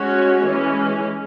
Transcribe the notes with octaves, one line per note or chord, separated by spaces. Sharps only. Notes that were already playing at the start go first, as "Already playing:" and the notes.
Already playing: G#3 C#4 F#4 C#5
E3 G#3 C#4